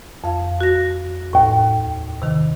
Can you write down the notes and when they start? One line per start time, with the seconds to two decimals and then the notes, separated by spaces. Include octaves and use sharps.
0.24 F2 F5
0.61 F#4 A#6
1.33 D#2 A2
2.22 C3 D#3